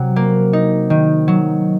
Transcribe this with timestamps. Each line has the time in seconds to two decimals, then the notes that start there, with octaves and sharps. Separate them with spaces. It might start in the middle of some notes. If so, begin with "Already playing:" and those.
Already playing: C3 F#3
0.16 A#3
0.53 D#4
0.90 D#3
1.28 F#3